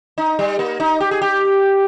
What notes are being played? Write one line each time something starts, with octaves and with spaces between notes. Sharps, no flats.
D#4
G3
A#3
D#4
G4
G#4
G4